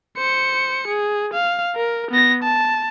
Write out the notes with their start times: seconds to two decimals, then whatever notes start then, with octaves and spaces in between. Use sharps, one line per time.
0.17 C5 C#7
0.88 G#4
1.34 F5
1.76 A#4
2.11 B3 A#6
2.43 A5